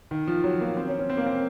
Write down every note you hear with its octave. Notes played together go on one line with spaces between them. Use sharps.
D#3
F3
F#3
A#3
C4
C#4
C#4
C4
A#3
C4